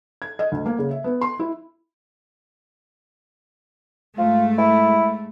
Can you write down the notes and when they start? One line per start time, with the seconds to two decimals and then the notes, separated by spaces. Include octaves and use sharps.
0.22 G#6
0.39 D#5
0.52 D2
0.66 A#3
0.79 C#3
0.91 E5
1.04 B3
1.21 C6
1.39 E4
4.18 G#2 A3 F4
4.58 E4